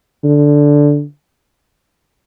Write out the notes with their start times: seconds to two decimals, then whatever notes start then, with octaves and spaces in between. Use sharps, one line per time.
0.24 D3